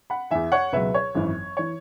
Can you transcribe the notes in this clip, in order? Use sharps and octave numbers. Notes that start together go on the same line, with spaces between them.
F#5 B5
E2 E3 E5 G#5
C#5 F#5
C#2 B2 F#3 B4 E5
C#5
G#1 F#2 E3
E3 C#5